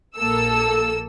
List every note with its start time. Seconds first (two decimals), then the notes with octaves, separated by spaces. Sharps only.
0.16 A#1 A#3 A4 E6